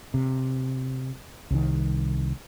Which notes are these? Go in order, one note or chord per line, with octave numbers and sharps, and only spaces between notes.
C3
C2 D#3